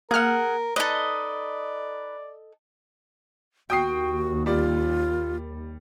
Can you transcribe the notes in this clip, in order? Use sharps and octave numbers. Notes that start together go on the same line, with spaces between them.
A#3 G#4 A#4 F#5 F6
D#4 A4 B4 D5 D#5
D#2 F#4 G5 D#6 C7
G3 F4 D5